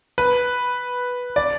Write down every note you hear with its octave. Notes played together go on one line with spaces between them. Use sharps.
B4
D5